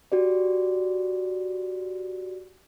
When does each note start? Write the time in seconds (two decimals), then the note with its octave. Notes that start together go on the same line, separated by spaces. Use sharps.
0.12 F#4 G4 D5